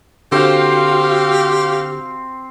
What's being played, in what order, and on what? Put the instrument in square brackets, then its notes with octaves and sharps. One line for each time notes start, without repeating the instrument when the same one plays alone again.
[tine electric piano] D3 [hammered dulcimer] C4 C5 [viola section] F#4 F5 [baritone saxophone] G4